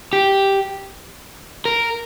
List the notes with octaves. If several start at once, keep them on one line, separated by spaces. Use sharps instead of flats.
G4
A#4